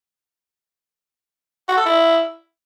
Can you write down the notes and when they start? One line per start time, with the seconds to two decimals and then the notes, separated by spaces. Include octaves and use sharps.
1.68 F#4
1.77 A4
1.85 E4